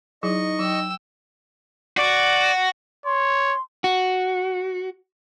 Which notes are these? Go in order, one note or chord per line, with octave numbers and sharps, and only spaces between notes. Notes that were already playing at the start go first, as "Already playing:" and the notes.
F#3 D#4 E4 G#4 D#5 C#6
F#3 G5 E6
F#4 D5
C#5 C6
F#4